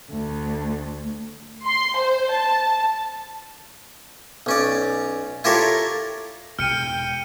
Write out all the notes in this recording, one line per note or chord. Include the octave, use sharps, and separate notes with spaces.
D2
C6
C5
A5
B1 C#4 D5
E4 F4 G4 A4 A#4 C#5
E1 G5 F6 C#7 D#7